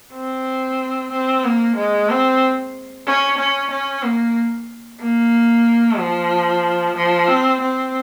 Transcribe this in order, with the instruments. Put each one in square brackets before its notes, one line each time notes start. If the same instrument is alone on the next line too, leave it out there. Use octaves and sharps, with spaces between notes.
[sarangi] C4
C4
A#3
G#3
C4
C#4
C#4
C#4
A#3
A#3
F3
F3
C4
C4